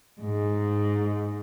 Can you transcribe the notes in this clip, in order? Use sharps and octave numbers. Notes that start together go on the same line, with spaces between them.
G#2